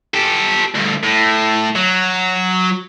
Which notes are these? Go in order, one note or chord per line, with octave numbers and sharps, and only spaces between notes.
G4 A4
D2 G2
A2
F#3